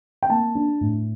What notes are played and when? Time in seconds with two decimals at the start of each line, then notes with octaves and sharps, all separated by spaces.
0.23 G5
0.30 A#3 A5
0.55 D4
0.81 A2